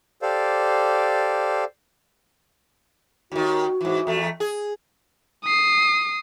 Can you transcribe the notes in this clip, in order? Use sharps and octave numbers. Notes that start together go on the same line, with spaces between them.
G4 A4 C5 D5 F5
D#2 D#3 F#4
G#2 E3
E2 A3
G#4
D#6 C7